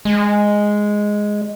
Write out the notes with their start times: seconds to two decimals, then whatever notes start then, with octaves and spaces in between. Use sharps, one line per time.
0.05 G#3